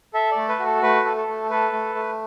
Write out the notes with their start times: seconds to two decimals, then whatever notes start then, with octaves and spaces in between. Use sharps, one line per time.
0.14 A4 E5
0.31 D5
0.36 A3
0.49 B4
0.59 F#4
0.66 A4
0.82 A3 B4
1.05 A4
1.17 A4
1.28 A3
1.50 A4 B4
1.73 A3
1.95 A3